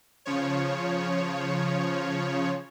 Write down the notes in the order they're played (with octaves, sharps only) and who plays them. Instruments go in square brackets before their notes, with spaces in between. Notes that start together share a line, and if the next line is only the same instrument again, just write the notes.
[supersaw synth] C#3 F3 C#5